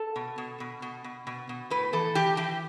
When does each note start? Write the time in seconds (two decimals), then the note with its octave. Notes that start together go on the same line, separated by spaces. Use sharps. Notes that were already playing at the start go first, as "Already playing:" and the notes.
Already playing: A4
0.16 B2
0.38 B2
0.60 B2
0.82 B2
1.04 B2
1.27 B2
1.49 B2
1.70 A2 B4
1.93 E3 A4
2.15 E3 G4
2.37 E3 G4